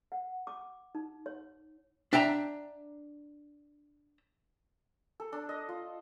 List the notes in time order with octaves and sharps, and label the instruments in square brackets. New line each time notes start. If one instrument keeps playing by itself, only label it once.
[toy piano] F#5
D6
D#4
C#5
[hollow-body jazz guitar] D4 E5 G5 A#5
[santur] A4
D4
D#5
F4